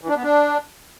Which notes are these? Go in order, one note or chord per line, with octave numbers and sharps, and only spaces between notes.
E3
D4
B3
D4